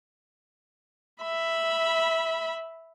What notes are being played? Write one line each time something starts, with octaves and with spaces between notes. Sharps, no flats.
E5 B5